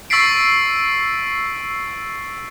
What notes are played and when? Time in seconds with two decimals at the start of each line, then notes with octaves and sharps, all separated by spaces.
0.10 C#6 E6 A6 B6 C7 D7